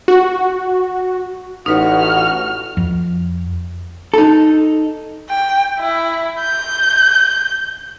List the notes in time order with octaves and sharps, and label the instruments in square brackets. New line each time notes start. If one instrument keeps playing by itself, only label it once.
[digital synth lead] F#4
[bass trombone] A1 [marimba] D#4 B4 C#5 [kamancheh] F#4 F6
[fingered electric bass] F2
[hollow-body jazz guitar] D#4 A4
[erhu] G5
E4
G6